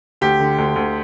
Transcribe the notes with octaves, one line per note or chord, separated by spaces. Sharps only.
D2 G4
D3
D2
D2